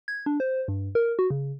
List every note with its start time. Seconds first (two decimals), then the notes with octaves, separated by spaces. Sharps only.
0.08 G#6
0.26 D4
0.40 C5
0.68 G2
0.95 A#4
1.19 F#4
1.30 C#3